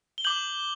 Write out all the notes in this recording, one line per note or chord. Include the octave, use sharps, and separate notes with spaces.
G7
D6 G6 F#7